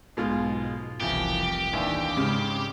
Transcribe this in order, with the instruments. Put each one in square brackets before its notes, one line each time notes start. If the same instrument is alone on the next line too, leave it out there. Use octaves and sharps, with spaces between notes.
[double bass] B1 G#2 [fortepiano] B2 G#3 F4
[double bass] F1 C2 [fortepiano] F2 E3 [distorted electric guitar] G4
[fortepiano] D#2 E3 [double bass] D4
[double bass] G#2 [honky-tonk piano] C#3 G#3 C#4 [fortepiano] F6